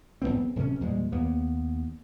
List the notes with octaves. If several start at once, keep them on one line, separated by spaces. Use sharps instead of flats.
F#1 F2 B3 C4
D1 C3 A#3 C#4
E2 A#2 G3 G#3
D#2 A#3 B3